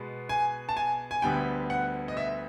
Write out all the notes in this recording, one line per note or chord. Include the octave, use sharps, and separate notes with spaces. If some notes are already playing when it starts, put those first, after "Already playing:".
Already playing: B2 G#3 B3
G#5
A5
G#5
G#5
D2 D3 G3 B3 G5
F#5
D#5
E5